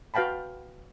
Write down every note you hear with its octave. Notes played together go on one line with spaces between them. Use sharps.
F#4 B4 F5 G5 A5 B5